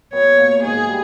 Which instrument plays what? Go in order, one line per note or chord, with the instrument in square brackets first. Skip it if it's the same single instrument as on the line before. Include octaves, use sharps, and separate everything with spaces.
[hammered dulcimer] B2 B3 [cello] C#5
[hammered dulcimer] A#2 A#3
[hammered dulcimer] G#2 G#3 [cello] G#4
[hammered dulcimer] G3